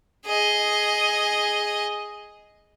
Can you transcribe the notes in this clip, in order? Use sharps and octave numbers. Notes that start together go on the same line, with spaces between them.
G#4 D#5